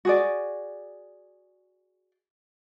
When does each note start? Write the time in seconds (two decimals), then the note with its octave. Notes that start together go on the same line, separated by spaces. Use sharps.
0.05 F#4 G#4 D5